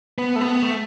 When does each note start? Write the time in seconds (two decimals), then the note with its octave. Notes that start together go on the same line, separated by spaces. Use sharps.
0.18 B3
0.36 A3
0.41 B3
0.62 A3